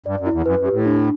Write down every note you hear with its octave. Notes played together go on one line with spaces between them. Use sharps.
G2 D5
F#2
E4
E2
F#2 B4
F#2
G4
A2
D4